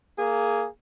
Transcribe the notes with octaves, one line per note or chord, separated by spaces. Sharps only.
A#3 G#4